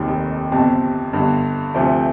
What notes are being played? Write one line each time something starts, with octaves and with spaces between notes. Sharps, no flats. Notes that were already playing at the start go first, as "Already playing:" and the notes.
Already playing: F1 D#2 D#3
G1 F2 C3 A5
G1 G2 D3
D2 C3 F3 A3